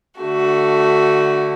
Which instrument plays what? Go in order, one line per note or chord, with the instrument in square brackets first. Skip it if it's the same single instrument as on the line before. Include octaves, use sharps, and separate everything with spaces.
[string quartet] D3 A3 F#4